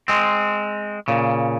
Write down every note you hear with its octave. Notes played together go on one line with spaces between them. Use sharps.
G#3 C4
A#2 C#3